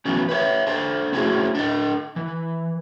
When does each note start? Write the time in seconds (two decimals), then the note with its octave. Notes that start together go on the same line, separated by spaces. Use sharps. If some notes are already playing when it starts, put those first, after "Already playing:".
0.05 E3 F#3 A3 B3 C#4
0.29 B4 C#5 E5
0.67 D4 A4 C5
1.12 A3 C4 C#4 E4 F#4 G#4
1.55 D4 A4 D#5
2.16 E3